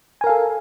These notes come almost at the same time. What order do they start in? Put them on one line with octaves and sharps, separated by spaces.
G#5 A#4 F5 A4